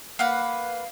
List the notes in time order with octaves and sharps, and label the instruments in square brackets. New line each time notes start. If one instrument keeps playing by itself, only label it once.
[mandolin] A#3 B4 F#5 [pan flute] F5